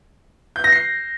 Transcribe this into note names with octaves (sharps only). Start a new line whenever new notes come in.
G6
A#6
C7